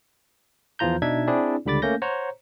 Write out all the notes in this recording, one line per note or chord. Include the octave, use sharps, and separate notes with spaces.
E2 E3 F3 F4 A#5 G6
B2 D4 D#4 E5 G#6
C4 D4 E4 G#4 D5
C#2 D3 G3 B5 D6 A6
A3 A#3 C#4 G6 A#6
C5 C#5 F#5 A#5